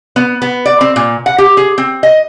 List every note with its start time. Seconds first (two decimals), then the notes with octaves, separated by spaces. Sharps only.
0.16 B3
0.42 B3
0.66 D5
0.81 C4
0.96 A#2
1.26 F#5
1.38 G4
1.57 G#4
1.78 C4
2.03 D#5